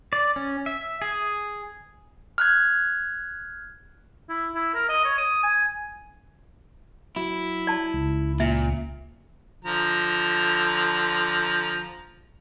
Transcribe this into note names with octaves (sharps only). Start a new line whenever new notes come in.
D5
C#4
E5
G#4
F6 F#6 G#6
E4
E4
A#4
D#5
C#5
D#6
G#5
F#3 E4
D5 A5
C#2
A#2 E5
D3 F3 A#5